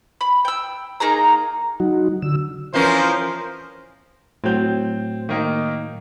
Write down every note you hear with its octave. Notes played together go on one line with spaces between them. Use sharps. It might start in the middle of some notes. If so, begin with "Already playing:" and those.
B5
G5 E6
A#3 D#4 G#4 A#5
F#3 D#4 F#4
D3 E6
E3 F3 C#4 A#4 C5
A2 F#3 C4 G6
D#3 A#3 D#4